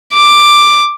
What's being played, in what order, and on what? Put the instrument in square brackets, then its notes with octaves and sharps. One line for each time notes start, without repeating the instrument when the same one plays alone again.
[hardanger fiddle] D6